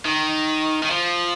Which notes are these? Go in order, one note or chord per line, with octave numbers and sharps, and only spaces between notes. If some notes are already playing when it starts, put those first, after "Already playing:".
D#3
D#3
F3